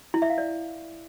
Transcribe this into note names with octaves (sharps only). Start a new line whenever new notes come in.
E4
E5
F5
D5